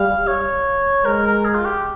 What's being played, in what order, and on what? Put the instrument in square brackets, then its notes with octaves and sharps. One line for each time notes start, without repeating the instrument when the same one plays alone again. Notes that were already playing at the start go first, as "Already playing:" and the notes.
Already playing: [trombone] G3 [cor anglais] F5
[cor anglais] C#5
[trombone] G#3 [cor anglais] A#4
[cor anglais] A#4
G#4
F4
G4